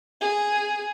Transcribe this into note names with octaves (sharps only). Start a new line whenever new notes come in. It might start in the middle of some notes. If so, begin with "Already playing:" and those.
G#4